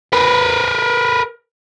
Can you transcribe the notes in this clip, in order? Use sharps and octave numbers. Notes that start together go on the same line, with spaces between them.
A#4 B4